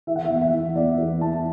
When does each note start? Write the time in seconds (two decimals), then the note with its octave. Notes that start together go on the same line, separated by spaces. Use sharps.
0.07 E3 E5
0.16 F#5
0.25 E5
0.30 E2
0.41 E5
0.53 E3
0.75 E2 D5
0.98 E3
1.21 E2 A5